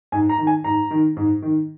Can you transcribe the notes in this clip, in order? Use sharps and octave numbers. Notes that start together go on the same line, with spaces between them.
G#2 G#5
A#5
D#3
G#5
G#2 A#5
D#3
G#2
D#3